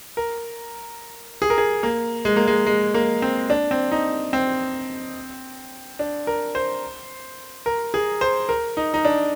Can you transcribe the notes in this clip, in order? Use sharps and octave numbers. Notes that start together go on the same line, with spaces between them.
A#4
G#4
A#4
G#4
A#3
G#3
A#3
G#3
G#3
A#3
C4
D4
C4
D#4
C4
D4
A#4
C5
A#4
G#4
C5
A#4
D#4
D#4
D4